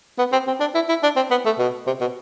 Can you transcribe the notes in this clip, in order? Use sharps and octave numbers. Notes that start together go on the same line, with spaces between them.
B3
C4
C4
D4
E4
E4
D4
C4
B3
A3
B2
C3
B2